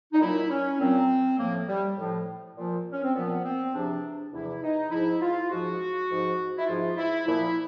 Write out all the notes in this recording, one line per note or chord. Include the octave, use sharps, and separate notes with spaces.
D#4
A#2 F#3 E4
C#4
A#2 F#3 C4
A2 F3 A#3
G3
A2 F3
A#2 F3
C#4
C4
A#2 F3 B3
C4
E2 C3 F3 D4
E2 C3 F3 E4
D#4
G#2 F3 E4
F4
G#2 F3 F#4
G#2 F3
E4
G#2 F3 F4
E4
A#2 F3 E4